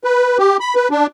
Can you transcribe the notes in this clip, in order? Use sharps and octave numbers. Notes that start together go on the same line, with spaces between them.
B4
G4
B5
B4
D4